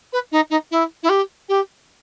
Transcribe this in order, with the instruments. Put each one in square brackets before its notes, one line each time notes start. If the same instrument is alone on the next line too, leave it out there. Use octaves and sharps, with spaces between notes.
[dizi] B4
D#4
D#4
E4
E4
G4
G4